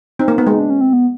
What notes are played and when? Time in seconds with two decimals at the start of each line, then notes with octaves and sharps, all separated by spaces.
0.19 C4 D#4
0.28 A#3
0.38 B3
0.47 G#3
0.59 D4
0.70 C#4
0.81 C4
0.93 B3